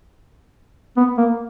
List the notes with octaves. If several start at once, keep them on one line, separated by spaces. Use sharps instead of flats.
B3
A#3